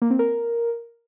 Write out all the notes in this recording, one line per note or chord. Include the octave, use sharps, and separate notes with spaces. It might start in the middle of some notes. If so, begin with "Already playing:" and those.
A#3
C4
A#4